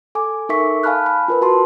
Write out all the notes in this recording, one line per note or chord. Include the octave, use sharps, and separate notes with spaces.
A4 G#5 D6
D#4 A4 A#4 E5 C#6 B6
F5 G#5 A5 B5 F6 F#6
B5
F4 A#4 B4
F#4 A5 C6